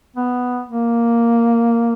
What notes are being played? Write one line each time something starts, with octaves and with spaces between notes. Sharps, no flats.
B3
A#3